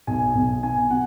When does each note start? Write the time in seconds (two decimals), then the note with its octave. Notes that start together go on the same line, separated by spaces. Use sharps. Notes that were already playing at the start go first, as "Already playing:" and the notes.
0.07 B1 G#5
0.35 B1
0.63 B2 G#5
0.90 B2 F#5